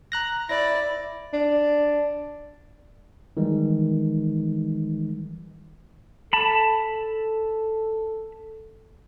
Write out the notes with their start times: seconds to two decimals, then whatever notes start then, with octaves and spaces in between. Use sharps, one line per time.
0.12 A#5 F#6 A#6
0.49 E4 D5 A#6
1.33 D4
3.37 D#3 E3 G3 G#3 D#4
6.33 A4 A5 B5